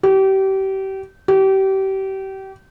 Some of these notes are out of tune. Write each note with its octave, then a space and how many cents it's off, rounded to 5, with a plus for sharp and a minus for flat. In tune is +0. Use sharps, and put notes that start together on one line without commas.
G4 -30
G4 -30